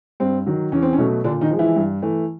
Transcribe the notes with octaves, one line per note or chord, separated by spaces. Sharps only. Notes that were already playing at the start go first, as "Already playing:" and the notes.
G2 C4
D#3 F#3
E2 C#4
C4
C#4
B2 F#3 A3
A#2 D3 D4
D#3 D#4
F3 G#3
E3 E4
G2
E3 A3